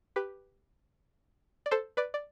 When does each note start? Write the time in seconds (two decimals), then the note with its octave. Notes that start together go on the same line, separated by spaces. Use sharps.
0.16 G4 B4
1.66 D5
1.71 A4 C5
1.97 B4 D5
2.14 D5